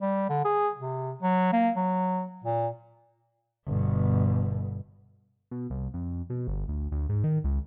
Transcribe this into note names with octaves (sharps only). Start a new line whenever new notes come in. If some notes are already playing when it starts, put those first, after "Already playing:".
G3
D3
G#4
C3
F#3
A#3
F#3
A#2
G1 B2
B2
C2
F2
B2
G1
D2
D2
G#2
D#3
C#2